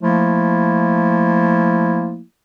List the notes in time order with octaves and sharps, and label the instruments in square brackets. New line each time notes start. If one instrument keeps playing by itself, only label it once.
[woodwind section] F3 A3 A#3 E4